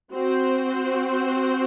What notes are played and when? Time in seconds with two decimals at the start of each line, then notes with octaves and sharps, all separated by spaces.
0.12 C4 F#4 C5